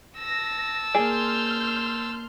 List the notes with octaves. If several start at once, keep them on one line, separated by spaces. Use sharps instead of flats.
A5 E6 A#6
A#3 G#4 D5 C6 F6 G6